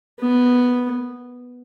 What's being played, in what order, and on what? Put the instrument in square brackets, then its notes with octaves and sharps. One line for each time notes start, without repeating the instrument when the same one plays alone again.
[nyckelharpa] B3